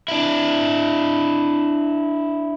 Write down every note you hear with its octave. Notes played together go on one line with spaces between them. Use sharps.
D4 E4